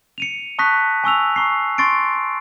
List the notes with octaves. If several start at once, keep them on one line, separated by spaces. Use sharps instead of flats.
C#7 D#7 F7
A5 C#6 D#6 F#6 A#6 B6
G#5 C#6 E6 F7
A#5 C#6 C7
C6 C#6 A6 C7 D7